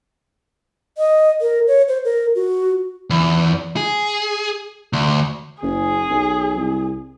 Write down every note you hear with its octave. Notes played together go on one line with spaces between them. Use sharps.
D#5
A#4
C#5
C5
A#4
F#4
E2
G#4
D2
F#1 G#4
B1
C2